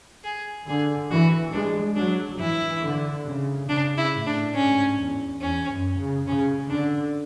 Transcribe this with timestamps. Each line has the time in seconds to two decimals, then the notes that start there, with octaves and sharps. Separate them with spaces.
0.24 G#4
0.67 D3 G#4
1.11 E3 F#4
1.53 G#3 D4
1.96 F#3 D4
2.39 E3 E4
2.83 D3
3.26 C#3
3.68 C#3 D4
3.98 E4
4.12 A2
4.27 D4
4.55 G#2 C#4
4.98 E2
5.41 E2 C#4
5.69 F#2
5.98 C#3
6.27 C#3 C#4
6.69 D3 D4